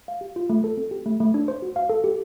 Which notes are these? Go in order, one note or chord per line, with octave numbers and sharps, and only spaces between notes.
F5
G4
F4
A3
A4
C4
G4
A3
A3
D4
C5
F#4
F5
A4
G4